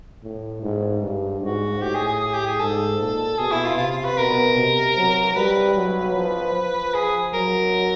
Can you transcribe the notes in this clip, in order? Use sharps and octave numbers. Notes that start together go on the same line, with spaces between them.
A2
G#2
G2
G#2 F#4
A2 G4
G#4
G#4
G#4
G4
G#4
G#2 A4
A#2
B2 G#4
E4
F4
C3 F4
F4
B4
B2 A#4
C3
F#3
G3 B4
F#3
F3
F3
G#4
F#3 A#4